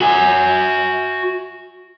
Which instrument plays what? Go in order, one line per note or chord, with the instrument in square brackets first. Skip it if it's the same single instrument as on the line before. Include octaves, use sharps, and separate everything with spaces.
[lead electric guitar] F#4 G#5